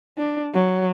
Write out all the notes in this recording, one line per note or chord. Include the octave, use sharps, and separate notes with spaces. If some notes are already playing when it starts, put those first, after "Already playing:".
D4
F#3